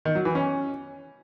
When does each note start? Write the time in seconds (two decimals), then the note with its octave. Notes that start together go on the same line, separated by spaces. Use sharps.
0.05 D#3
0.15 F#3
0.25 E3
0.35 C#4